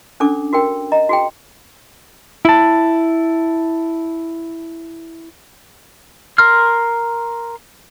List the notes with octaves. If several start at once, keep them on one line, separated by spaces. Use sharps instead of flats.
C#4 D4 A4 D6
F#4 A#4 G5
D#5 A#5
F#4 G#4 G5
E4 A5
A#4 C6 F6